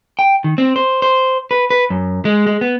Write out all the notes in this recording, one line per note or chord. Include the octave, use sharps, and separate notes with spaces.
G5
D#3
C4
C5
C5
B4
B4
F#2
G#3
G#3
B3